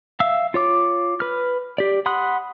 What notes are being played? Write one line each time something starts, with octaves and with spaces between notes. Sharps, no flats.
E5 F5 E6
F4 C#5 D6
B4 F6
G4 D5
F#5 B5 C6 D#6 F#6